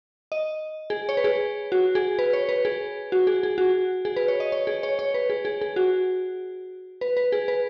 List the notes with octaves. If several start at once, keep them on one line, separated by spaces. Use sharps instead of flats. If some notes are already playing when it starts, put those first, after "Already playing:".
D#5
G#4
C#5
B4
G#4
F#4
G#4
B4
C#5
B4
G#4
F#4
G#4
G#4
F#4
G#4
B4
C#5
D#5
C#5
G#4
C#5
C#5
B4
G#4
G#4
G#4
F#4
B4
B4
G#4
B4